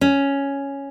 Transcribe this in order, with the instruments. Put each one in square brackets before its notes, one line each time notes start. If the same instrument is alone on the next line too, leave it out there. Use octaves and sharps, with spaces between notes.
[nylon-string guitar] C#4